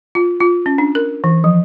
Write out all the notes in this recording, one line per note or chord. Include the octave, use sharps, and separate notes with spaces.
F4
F4
C#4
D4
A#4
E3
F3